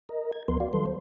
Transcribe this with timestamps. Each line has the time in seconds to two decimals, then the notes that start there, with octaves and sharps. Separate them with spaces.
0.09 A#4 D#5
0.32 G#6
0.48 D2 F3 B3 A#4 B4 C6
0.60 F#4 D5 F5
0.73 D#3 F#3 G3 A4 B4 C6
0.86 C5